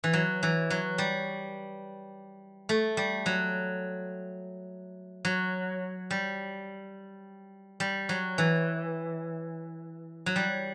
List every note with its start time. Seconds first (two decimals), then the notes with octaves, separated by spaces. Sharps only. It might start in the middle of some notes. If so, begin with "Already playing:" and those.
0.04 E3
0.13 F#3
0.43 E3
0.70 F#3
0.98 G3
2.69 A3
2.97 G3
3.26 F#3
5.25 F#3
6.11 G3
7.80 G3
8.09 F#3
8.38 E3
10.26 F#3
10.36 G3